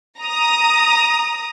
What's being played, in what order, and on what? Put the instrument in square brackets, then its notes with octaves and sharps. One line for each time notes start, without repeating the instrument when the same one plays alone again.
[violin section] A#5 D#6